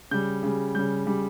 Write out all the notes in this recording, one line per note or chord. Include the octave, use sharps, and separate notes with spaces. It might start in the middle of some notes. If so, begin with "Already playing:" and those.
C#3 G3 G6
C#3 G3
C#3 G3 G6
C#3 G3